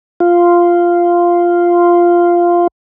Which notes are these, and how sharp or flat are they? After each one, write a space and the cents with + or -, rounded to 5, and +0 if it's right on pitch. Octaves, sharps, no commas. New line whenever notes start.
F4 -5